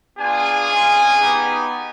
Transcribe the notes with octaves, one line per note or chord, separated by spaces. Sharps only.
B3 D4 F4 G#4 G#5
G#3 C#4 F4
B3 D#4 G4